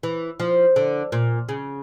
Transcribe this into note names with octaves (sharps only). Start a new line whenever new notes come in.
E3
F3
D3
A#2
C#3